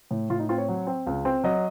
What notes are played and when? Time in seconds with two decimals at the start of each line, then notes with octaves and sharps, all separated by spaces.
0.11 A2
0.30 A2 F4
0.39 D#4
0.49 C4 F4
0.58 C#5
0.69 F#3
0.87 C4
1.07 C#2
1.25 C4
1.44 F#3 D#5